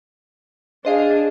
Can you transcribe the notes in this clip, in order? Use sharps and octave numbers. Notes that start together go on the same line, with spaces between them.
D4 G#4 C5 D#5 F5